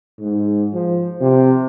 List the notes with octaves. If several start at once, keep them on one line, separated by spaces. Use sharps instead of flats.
G#2
F3
C3